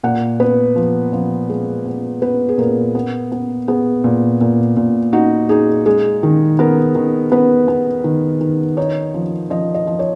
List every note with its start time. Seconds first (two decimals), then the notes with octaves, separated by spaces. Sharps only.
0.03 A#2 F#5
0.40 B3 B4
0.76 F3
1.13 F3
1.50 G#3
1.86 B3
2.22 B3 B4
2.49 G#4
2.58 A#2 A#4
2.95 B3
3.32 B3
3.68 B3 G#4
4.04 A#2
4.41 A#2
4.77 A#2
5.13 D#4 F#4
5.49 D#4 G#4
5.86 G#3 G#4
6.23 D#3
6.59 B3 A#4
6.95 D#3
7.32 B3 B4
7.68 B3
8.04 D#3
8.41 D#3
8.77 D#4 C#5
9.14 F3
9.50 F3 D#5
9.74 D#5
9.87 F3
9.99 C#5